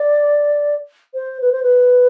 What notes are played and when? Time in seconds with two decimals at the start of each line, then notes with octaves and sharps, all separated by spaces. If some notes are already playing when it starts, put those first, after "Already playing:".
Already playing: D5
1.14 C5
1.41 B4
1.52 C5
1.62 B4